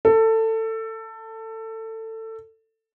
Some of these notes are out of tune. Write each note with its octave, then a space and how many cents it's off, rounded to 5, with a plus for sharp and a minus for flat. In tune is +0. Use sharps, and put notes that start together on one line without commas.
A4 +20